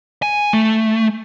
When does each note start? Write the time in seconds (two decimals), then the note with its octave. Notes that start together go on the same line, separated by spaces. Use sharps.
0.22 G#5
0.53 A3